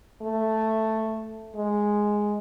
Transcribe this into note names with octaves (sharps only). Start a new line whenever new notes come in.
A3
G#3